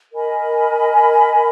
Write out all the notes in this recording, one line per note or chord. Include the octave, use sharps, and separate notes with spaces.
A#4 D#5 G#5 B5